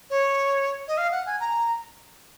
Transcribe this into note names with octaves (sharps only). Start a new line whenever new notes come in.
C#5
D#5
F5
F#5
G#5
A#5